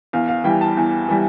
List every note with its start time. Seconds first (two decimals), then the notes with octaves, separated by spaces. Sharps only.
0.13 E2 F5
0.28 F5
0.44 E3 G3 G5
0.61 A5
0.77 E2
1.09 E3 G3